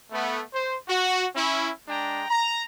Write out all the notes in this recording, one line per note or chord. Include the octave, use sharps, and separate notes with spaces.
A3 B3
C5
F#4
C#4 E4
G#3 D4 G5 A#5
A#5